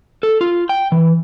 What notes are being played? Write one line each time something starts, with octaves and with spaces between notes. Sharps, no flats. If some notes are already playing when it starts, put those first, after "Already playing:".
A4
F4
G5
E3